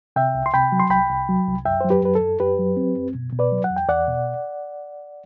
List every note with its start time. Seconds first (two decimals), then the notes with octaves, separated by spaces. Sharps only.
0.16 C3 E5 G5
0.35 C2
0.46 C6
0.54 C3 G5 B5
0.72 F#3
0.80 C6
0.90 C2 G5 B5
1.10 C2
1.29 F#3
1.47 C2
1.65 F#2 E5 G5
1.81 F#3 C5
1.90 G4 B4
2.02 F#2 B4
2.15 A4
2.21 F#2
2.40 F#2 G4 B4
2.59 F#3
2.77 C4
2.96 F#2
3.15 B2
3.33 B2
3.39 B4 D5
3.52 F#3
3.64 F#5
3.70 E2
3.77 G5
3.89 E2 D5 F#5
4.08 B2